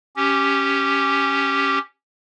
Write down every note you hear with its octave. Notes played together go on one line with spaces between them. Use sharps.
C#4 G4